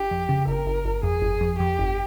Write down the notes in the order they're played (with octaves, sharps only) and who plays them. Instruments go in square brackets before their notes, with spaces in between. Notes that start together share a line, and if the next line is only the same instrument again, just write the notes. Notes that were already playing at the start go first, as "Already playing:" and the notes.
Already playing: [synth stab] G1 [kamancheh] G4
[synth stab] F2
C#3
[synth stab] G1 [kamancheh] A#4
[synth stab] G1
G1
[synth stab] F2 [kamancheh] G#4
[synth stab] G1
F2
[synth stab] F2 [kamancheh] G4
[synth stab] G1